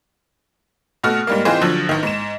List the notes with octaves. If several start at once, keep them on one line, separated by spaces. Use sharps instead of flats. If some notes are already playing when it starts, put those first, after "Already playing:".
B2 A3 F#4 F6
G#2 G3 A#3
E3 C4 D#4 F4 G#4 C5
D3 F3 F#3
A1 D#3
G#2 E7